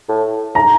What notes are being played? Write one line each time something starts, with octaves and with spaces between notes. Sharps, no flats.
A2
A2 A#5